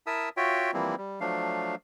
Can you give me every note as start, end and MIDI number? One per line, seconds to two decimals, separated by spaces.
0.07 0.29 64
0.07 0.29 70
0.07 0.29 76
0.07 0.29 81
0.07 0.29 87
0.07 0.29 88
0.37 0.71 65
0.37 0.71 66
0.37 0.71 73
0.37 0.71 76
0.37 0.71 79
0.74 0.95 52
0.74 0.95 53
0.74 0.95 55
0.74 0.95 58
0.74 0.95 60
0.74 0.95 64
0.98 1.20 55
1.21 1.75 53
1.21 1.75 54
1.21 1.75 57
1.21 1.75 62
1.21 1.75 77